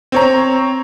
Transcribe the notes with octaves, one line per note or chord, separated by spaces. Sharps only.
C4 C#5 A#5